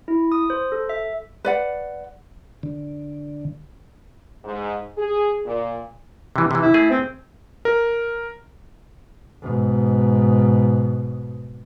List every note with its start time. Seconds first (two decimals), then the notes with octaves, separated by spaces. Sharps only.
0.08 E4
0.32 D#6
0.50 C5
0.72 A4
0.89 E5
1.44 B4 D5 F#5
2.63 D3
4.45 G#2
4.98 G#4
5.46 A#2
6.36 C3 E3
6.51 C3 E3
6.62 E4
6.74 A3 G#4
6.91 C4
7.65 A#4
9.42 G#2 B2